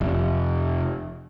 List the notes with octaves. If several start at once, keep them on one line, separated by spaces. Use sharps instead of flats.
F1